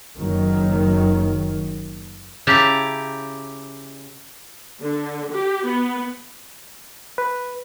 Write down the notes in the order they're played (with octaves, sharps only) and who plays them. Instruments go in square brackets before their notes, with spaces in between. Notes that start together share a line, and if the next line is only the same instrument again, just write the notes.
[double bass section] F#1 D#3 F#3
[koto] C#3 E4 G4 A5 A#5
[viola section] D3
G4
B3
[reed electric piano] B4